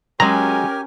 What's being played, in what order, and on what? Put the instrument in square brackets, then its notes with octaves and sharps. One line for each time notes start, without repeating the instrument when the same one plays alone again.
[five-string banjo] F#3 G#3 [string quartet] C#4 A#4 [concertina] G4 G#5 [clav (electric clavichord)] A#5